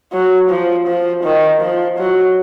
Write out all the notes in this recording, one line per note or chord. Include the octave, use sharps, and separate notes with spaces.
F#3
F3
F3
D#3
F3
F#3